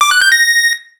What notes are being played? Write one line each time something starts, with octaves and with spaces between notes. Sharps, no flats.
D6
F#6
G6
A#6